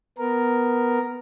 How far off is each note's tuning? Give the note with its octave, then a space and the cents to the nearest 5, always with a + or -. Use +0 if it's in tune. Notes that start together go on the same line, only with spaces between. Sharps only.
B3 +0 A#4 +0